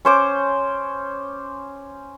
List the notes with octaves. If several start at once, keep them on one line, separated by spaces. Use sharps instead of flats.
C#4 C5 D6